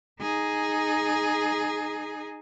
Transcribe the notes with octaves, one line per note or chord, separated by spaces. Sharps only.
D#4 G#4